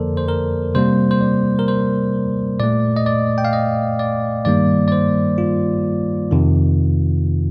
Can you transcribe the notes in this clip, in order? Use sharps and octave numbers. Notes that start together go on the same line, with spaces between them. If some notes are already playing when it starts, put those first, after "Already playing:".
Already playing: F2 D3 F3 A#3 A4 A#4 C5 D5
C5
A#4
C3 G3 A#3 C5
C5
D5
A#4
C5
A#2 A3 D5
D#5
D5
G5
F5
D#5
D5
G2 D#3 G3 A#3 D5
D5
C5
F4
F2 C3 D#3